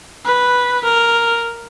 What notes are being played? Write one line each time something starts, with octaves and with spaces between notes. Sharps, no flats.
B4
A#4